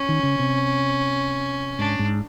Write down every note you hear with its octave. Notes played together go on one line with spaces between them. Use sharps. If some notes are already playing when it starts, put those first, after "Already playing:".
Already playing: C#4
D#3
C#3
C3
G#2 D4
G#2